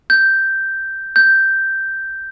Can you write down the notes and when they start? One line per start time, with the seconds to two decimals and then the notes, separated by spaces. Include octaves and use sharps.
0.10 G6
1.16 G6